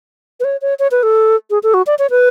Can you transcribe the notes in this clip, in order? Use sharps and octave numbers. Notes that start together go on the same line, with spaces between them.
B4
C#5
C#5
C#5
B4
A4
G#4
A4
F#4
D5
C#5
B4